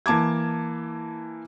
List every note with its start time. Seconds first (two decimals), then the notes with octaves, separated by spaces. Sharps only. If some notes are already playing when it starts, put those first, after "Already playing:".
0.06 E3 A#3 A5 D6 G#6